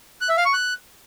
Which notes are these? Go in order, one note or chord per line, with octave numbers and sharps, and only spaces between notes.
F#6
E5
F5
C#6
F#6